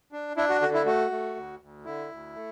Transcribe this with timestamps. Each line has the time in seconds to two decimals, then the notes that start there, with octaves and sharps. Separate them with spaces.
0.12 D4
0.37 D4 E4
0.49 F#4
0.61 D3 F#4
0.74 E4
0.86 A3 F#4
1.11 A3
1.35 D2
1.61 D2
1.85 D3 E4
2.10 D2
2.35 A3